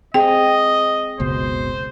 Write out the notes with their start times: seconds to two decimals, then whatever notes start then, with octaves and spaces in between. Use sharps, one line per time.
0.14 C4 G#4 D#5 G5
1.20 F#1 C#2 B2 C5